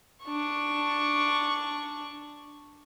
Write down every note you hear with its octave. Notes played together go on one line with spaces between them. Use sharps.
D4 C#6